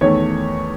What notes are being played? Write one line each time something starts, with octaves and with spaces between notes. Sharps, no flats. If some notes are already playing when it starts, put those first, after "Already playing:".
E2 D#3 A3 C#5